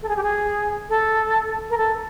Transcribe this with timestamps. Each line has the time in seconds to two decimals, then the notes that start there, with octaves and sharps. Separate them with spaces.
0.02 A4
0.09 G#4
0.17 G4
0.23 G#4
0.89 A4
1.70 A#4
1.78 A4